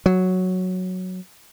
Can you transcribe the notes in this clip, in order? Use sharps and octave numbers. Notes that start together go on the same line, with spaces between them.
F#3